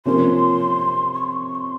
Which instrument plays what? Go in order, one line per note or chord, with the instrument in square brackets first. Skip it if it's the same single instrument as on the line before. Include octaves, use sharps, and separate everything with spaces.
[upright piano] C3 F3 A#3 C#4 [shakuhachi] C6
[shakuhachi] C#6
C6
C#6
C6